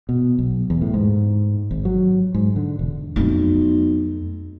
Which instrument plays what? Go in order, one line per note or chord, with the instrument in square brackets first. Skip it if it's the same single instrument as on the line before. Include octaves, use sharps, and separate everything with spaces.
[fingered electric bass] B2
B1
E2
A2
G#2
G#1
F#3
G#2
D3
E1
[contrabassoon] B1 [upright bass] F2 A3